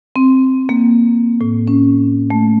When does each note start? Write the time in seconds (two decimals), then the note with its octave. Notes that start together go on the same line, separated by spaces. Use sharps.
0.16 C4
0.69 A#3
1.41 A2
1.67 C#4
2.30 A3